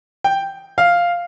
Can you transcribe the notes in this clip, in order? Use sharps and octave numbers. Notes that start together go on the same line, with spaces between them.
G5
F5